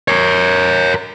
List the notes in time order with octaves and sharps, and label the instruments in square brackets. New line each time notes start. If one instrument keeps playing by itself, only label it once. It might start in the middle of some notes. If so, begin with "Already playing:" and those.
[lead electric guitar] A#4 C#5